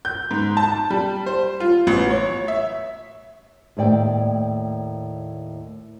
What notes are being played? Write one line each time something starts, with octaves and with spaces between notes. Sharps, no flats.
G6
G#2
A5
G3
C5
F4
A1
C#5
E5
D#2 A2 D5 G5